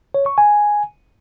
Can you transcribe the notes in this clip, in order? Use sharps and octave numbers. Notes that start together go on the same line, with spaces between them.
C#5
C#6
G#5